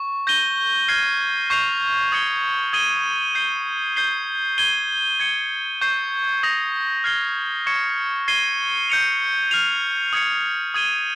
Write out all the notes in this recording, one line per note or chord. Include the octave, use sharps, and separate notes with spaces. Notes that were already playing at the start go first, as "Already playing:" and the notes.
Already playing: C#6
G6 A#6 D#7 G7
F6 G#6 C7 D#7 G7
C#6 G6 C7 F7
D#6 G#6 C#7 G7
D#6 G#6 D#7 G7
G6 C7 G7
G6 C7 G7
G#6 D#7 G7
G#6 C#7 G7
C#6 G6 C7
D#6 A#6 F7
F6 G#6 C7 G7
C#6 G#6 C#7
G#6 C7 D#7 G7
G6 C#7 F7
F6 C7 F7
D#6 G#6 C#7
D#6 G#6 D#7 G7